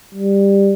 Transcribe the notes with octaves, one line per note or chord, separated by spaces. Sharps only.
G3